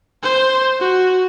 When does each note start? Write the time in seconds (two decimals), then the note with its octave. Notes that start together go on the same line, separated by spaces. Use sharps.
0.23 C5
0.80 F#4